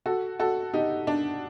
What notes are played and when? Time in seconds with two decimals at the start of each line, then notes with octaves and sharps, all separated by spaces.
0.06 F#4 A4
0.40 F#4 A4
0.74 D#4 G4
1.07 D4